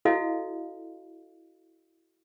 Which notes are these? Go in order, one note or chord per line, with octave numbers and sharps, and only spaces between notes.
E4 F#4 A4 D#5 F5